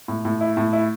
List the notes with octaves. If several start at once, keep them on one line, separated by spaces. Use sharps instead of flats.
A2
A2
E4
A2
E4